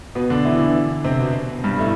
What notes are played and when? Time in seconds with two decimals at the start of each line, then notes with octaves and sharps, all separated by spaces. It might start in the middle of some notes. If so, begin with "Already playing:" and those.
0.15 B2 B3
0.30 D3 D4
0.45 E3 E4
0.60 D3 D4
1.04 C3 C4
1.19 B2 B3
1.64 G2 G3
1.78 A2 A3